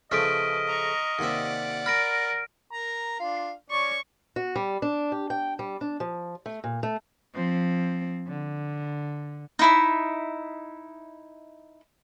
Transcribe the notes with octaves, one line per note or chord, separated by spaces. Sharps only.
C#3 F3 A3 B4 D#5 F6 B6 D7
A#5 C#6
D#2 C3 D5 E5 F#5
A#4 B5 F6 A#6 D7
A#4 A#5
D4 F4 F5
C#4 D5 C#6
F#4
G3
D4
G4
G5
G3
D4
F3
A3
A#2
A3
F3 C4
D3
D#4 E4 E5